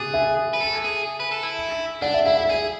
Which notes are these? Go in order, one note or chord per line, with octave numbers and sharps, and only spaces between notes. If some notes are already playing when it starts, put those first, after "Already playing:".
Already playing: G#4 D6 F#6 A6
E5 G#5
B4
A4
G#4
B4
A4
E4
D4 D5 F#5
E5
E4 E5
E5
G#4